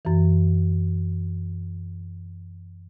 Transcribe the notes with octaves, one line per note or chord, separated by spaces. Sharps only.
F#2 E3